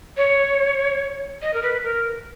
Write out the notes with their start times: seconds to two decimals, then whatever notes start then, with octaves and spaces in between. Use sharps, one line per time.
0.17 C#5
1.42 D#5
1.54 A#4
1.63 B4
1.83 A#4